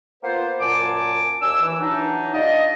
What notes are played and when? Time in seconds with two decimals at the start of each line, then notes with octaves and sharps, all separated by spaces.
0.23 A#3 B3 F4 C5
0.60 F#2 A#2 G#5 A5 D6
1.42 D#2 D4 G#5 E6
1.62 E3
1.80 E3 F#3 D4 D#4
2.34 G3 F4 D5 D#5